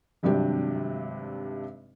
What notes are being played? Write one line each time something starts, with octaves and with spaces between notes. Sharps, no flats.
G#1 G2 C3 F#3 D4 G4